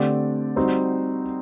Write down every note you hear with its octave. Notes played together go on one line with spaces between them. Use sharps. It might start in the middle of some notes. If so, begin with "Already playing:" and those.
Already playing: D3 A3 C4 G4 D5
G3 C4 D#4 F#4 C5